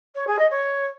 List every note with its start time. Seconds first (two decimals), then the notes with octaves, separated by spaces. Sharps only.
0.15 C#5
0.27 G#4
0.38 D#5
0.50 C#5